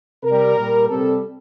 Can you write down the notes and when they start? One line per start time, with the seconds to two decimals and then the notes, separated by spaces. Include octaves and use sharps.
0.24 C3 G3 A#4
0.57 A#2 G3
0.89 C3 G3 A4